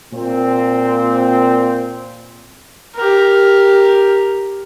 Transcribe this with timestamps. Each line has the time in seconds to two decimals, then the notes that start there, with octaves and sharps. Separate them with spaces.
0.11 A#2 C4
2.96 G4 A#4